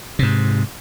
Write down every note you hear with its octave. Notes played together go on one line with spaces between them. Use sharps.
G#2 C3